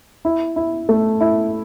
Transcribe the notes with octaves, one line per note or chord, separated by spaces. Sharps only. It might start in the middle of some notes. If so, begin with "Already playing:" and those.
E4
E4
A3
E4